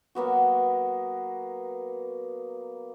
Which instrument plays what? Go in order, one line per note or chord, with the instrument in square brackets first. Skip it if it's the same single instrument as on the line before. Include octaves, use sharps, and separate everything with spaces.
[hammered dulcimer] F#3 A#3 B3 F#4